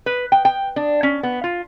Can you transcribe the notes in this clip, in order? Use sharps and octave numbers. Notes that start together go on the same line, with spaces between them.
B4
G5
G5
D4
C#4
B3
F4